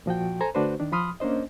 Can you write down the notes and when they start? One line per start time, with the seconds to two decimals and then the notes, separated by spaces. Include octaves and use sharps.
0.06 A#2 F3 F#4 G5
0.40 A4 C5 G#5 A#5
0.55 D3 A3 D4 F#4 B4 C5
0.80 D#3 D4
0.92 F3 B5 C6 D#6 F6
1.20 A#3 C#4 D4 C5 D#5